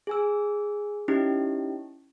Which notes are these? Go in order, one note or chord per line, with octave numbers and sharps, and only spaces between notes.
G#4 G#5 E6
C#4 D#4 E4 G4